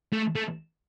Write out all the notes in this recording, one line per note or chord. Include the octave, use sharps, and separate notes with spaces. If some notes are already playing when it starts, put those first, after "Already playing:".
A3
A3